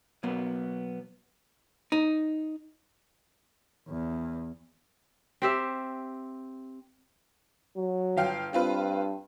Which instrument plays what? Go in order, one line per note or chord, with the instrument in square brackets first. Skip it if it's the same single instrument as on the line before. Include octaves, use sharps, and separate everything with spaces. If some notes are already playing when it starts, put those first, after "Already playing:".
[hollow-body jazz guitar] B2 F#3 A#3 B3 B4
D#4
[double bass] E2
[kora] C4 G4 E5
[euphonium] F#3
[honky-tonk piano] G1 F5 G5
[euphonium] G2 [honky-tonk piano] C4 F4 B4